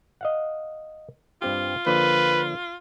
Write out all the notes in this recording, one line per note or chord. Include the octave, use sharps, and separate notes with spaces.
D#5 F5 F#5
G2 C4 F4 G4
D3 F3 A#3 B4